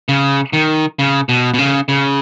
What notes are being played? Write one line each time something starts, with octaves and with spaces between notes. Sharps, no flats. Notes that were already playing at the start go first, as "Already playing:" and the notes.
C#3
D#3
C#3
B2
B2
C#3
C#3